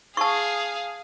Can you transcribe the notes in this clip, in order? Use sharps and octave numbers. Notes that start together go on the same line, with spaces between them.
G#4 F5 A5 C#6